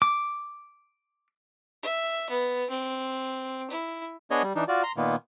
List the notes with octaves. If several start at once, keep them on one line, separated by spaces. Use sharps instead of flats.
D6
E5
B3
C4
E4
B3 D4 G#4 C#5 D#5
G3
E3 D4 D#4
F4 F#4 D5
A#5 C6
A#2 D#3 A#3 B3